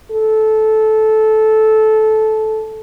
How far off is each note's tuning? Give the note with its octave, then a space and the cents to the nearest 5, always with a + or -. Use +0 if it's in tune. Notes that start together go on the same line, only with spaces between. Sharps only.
A4 -15